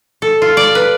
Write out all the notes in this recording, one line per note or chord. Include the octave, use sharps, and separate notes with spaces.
A4
F4
D5
B4